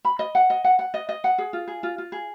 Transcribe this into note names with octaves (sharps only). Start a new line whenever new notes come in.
B5
D#5
F#5
D#5
F#5
F#5
D#5
D#5
F#5
G#4
F4
G#4
F4
F4
G#4